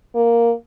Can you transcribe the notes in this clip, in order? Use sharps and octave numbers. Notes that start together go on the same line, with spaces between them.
A#3